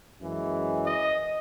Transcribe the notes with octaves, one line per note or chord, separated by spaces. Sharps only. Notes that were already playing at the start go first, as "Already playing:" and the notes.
F#2 E3 G#3
D#5